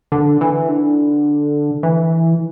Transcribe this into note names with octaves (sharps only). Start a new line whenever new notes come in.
D3
E3
D3
E3